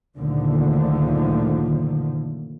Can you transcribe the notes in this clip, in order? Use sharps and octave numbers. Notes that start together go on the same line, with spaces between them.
F#1 D2 A#2 D3 D#3 F3